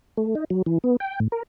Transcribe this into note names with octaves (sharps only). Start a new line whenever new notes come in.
A3
D#4
F#3
E3
B3
G5
A2
A#4